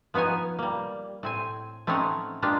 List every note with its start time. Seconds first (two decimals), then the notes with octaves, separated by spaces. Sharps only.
0.14 F3 B3 D#4 C#5 G#5
0.59 G3 A#3
1.23 A2 C4 G#5
1.87 A3 C4 C#4 D#4 C#5 F#5
2.42 G#3 A#3 D4 F4 G4